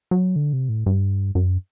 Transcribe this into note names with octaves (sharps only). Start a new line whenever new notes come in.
F#3
D3
C3
A2
G2
F#2